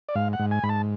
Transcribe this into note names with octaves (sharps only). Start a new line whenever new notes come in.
D5
G#2 F5
F#5
G#2
G#5
G#2 B5
A5